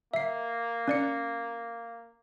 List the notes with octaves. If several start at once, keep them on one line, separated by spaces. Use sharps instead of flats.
A#3 E5 C7
C#4 D5 C#7